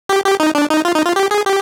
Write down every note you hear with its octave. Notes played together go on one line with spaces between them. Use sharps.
G4
G4
D#4
D4
D#4
F4
D#4
F4
G4
G#4
G4